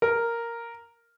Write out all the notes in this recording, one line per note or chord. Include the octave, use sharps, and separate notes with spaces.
A#4